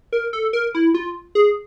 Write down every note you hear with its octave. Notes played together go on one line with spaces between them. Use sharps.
A#4
A4
A#4
E4
F4
G#4